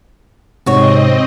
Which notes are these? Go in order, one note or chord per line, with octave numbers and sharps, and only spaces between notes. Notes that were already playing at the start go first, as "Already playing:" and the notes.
G#2 C3 C4 F#4 C#5 D#5